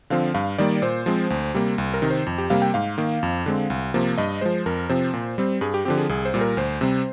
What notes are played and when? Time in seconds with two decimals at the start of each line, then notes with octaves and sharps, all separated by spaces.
0.10 D3 F3 C4 F5
0.34 G2 F5
0.58 D#3 G3 A#3 D5
0.82 A#2 C5
1.06 F3 G#3 C4
1.30 D2
1.54 C3 G3 A#3
1.78 C2
1.94 A#4
2.02 C3 D#3
2.10 C5
2.27 F2
2.38 G4
2.50 C3 G3 A#3 F5
2.62 G5
2.74 G#2 F5
2.98 D#3 A#3
3.23 F2
3.46 D3 G#3 C4
3.70 C2
3.94 C3 F3 A#3
4.18 G2 D#5
4.41 F3 G#3 C5
4.66 F2 A#4
4.89 C3 F3 C4 C5
5.14 A#2
5.38 G3 C4
5.61 G2 G#4
5.74 G4
5.85 D3 F3 C4 G4
5.98 G#4
6.09 C2 G#4
6.25 C5
6.34 A#2 G3
6.41 A#4
6.57 D2 C5
6.81 C3 G3 C4